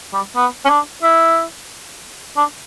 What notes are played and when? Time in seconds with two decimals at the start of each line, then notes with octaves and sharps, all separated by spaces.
0.13 G3
0.36 B3
0.65 C#4
0.69 D4
1.03 E4
2.37 D4